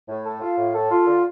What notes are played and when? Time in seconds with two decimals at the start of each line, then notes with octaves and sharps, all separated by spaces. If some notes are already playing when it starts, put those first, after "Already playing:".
0.09 A2
0.25 A4
0.41 F4
0.58 A2
0.74 A4
0.91 F4
1.07 D3